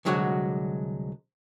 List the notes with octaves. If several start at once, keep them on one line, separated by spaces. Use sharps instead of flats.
C2 D3 F#3 G#3 F#4 F#5